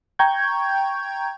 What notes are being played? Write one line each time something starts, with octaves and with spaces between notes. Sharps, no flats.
G5 A#5 C#6 G6 G#6